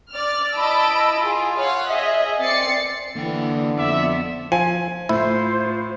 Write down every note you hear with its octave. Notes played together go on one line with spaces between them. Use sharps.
D5 F6
E4 D#5 A5 B5 E6 D7
F4 G#4
C#5 F5 F#5
G#4 D#5 E5
C4 D5 A6 C7 C#7
D3 E3 A#3 G5
F2 B3 D5 E5
F3 G#5
A2 E4 F4 C5